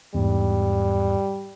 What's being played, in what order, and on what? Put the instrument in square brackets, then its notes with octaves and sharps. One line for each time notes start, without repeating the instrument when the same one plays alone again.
[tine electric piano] E2 G#2 [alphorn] G3